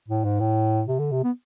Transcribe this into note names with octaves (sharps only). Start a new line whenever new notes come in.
A2
G#2
A2
C3
D3
C3
B3